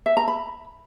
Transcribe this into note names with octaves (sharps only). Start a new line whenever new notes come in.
E5
A#5
B5